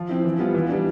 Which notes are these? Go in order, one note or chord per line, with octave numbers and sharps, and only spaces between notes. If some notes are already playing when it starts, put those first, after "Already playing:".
Already playing: F3
C4 E4
E3
G3 B3 F4
E3
G3 D4